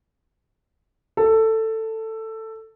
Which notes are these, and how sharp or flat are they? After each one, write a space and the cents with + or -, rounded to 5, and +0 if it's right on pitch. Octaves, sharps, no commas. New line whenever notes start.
A4 +10